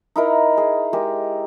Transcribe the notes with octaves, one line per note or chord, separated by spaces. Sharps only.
D#4 E4 A#4
G#4
G#3 G4 A#4